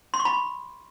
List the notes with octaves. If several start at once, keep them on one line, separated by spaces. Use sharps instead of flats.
C6
C#6
B5